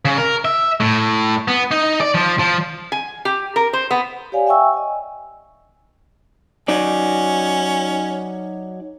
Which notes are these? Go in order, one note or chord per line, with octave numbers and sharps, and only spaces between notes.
C#3
A#4
E5
A2
B3
D#4
D5
F3
F3
G#5
G4
A#4
C5
B3
G4 C#5 D5 F5 G#5
E5 G5 G#5 C#6 E6
D#5 G#5
F#3 C#4 D#4 D5